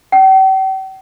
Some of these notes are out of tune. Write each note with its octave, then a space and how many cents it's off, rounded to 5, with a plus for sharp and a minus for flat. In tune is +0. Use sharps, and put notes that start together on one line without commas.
G5 -45